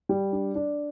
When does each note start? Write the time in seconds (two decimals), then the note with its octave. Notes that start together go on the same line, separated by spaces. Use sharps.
0.09 G3
0.32 D4
0.55 D4